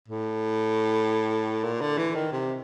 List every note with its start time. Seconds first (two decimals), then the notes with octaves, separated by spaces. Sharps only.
0.09 A2
1.64 A#2
1.81 D3
1.98 E3
2.15 D#3
2.32 C3